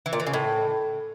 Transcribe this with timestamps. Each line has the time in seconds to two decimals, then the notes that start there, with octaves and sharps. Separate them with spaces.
0.06 E3
0.13 A#2
0.20 E3
0.27 C#3
0.33 A2